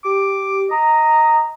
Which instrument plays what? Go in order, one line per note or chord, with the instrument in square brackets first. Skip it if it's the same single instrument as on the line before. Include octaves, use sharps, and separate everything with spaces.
[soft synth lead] G4 [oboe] D6
[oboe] D#5 [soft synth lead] A#5